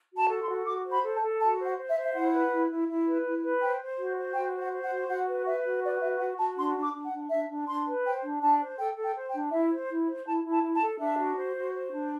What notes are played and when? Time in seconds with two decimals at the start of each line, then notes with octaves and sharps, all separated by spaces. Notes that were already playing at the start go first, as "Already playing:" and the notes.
0.12 F#4
0.17 A5
0.29 A4
0.42 C6
0.49 F#4
0.66 F#4 D6
0.85 C5
0.92 B5
1.03 A4
1.16 A5
1.22 A4
1.40 F#4 A5
1.59 C5
1.64 F#5
1.78 C5
1.89 E5
1.96 C5
2.04 E5
2.14 E4 F#5
2.33 B4
2.51 E4
2.70 E4
2.88 E4
3.06 B4
3.24 E4
3.43 B4
3.61 C5 G5
3.80 C5
3.98 F#4
4.17 C5
4.35 F#4 G5
4.54 C5
4.60 F#5
4.72 C5
4.84 F#5
4.91 F#4
5.09 F#4 F#5
5.28 B4
5.46 B4 E5
5.65 F#4
5.83 B4 D5
6.02 F#4 E5
6.20 F#4 F#5
6.38 F#4 A5
6.56 D4 C6
6.76 D4
6.82 D6
6.93 D4
7.06 F#5
7.12 D4
7.30 D4 E5
7.48 D4
7.67 D4 C6
7.86 B4
8.04 C5 G5
8.23 D4
8.41 D4 A5
8.60 C5
8.78 A4 G5
8.96 A4
9.03 G5
9.15 C5
9.27 G5
9.34 D4
9.51 E4 E5
9.70 C5
9.89 E4
10.07 C5
10.25 E4 A5
10.44 E4
10.51 A5
10.63 E4
10.74 A5
10.81 A4
11.00 D4 E5
11.18 F#4
11.36 C5
11.55 F#4
11.73 C5
11.92 D4